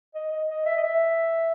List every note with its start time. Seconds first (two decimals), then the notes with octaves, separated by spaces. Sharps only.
0.15 D#5
0.31 D#5
0.49 D#5
0.66 E5
0.77 D#5
0.83 E5